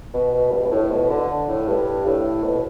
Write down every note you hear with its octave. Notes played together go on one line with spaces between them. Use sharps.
B2
B2
G2
B2
A2
B2
D3
A2
G2
A2
B2